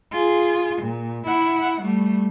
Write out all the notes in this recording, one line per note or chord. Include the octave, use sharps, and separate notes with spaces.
F4 G#4
A#2
E4 F#5
G3 A3